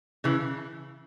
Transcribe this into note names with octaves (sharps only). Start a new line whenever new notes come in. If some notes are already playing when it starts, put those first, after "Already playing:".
C#3 E3